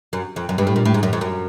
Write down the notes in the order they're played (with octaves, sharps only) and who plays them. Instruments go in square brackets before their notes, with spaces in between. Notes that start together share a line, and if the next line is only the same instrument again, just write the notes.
[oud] F#2
F2
F#2
G2
A2
A#2
A2
G#2
F#2
F2
F#2